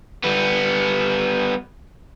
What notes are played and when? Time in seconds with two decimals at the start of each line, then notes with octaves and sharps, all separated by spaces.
0.24 G3 B3